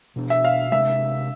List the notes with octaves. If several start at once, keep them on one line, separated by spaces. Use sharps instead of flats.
B2 B3 D4
E5
F5
C3 G#3 D4 E5